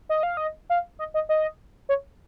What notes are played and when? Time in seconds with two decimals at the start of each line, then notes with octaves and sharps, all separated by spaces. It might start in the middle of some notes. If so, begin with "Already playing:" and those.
0.09 D#5
0.23 F5
0.37 D#5
0.70 F5
0.99 D#5
1.14 D#5
1.29 D#5
1.89 C#5